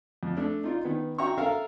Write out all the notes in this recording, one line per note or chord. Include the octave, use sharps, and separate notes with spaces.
F2
A3 D4
D#4 F4 D5
D#3 B3
F#4 E5 G5 A#5 C#6
A4 A#4 E5 F5 A#5